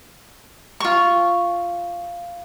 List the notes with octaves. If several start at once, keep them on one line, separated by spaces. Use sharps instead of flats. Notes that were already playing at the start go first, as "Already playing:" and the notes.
F4 C#6